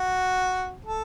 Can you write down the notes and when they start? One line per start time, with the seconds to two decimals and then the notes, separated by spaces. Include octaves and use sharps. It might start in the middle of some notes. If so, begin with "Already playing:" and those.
Already playing: F#4
0.84 A4